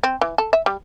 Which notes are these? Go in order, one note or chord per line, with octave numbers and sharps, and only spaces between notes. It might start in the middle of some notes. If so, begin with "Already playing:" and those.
C4
E3
A4
E5
G3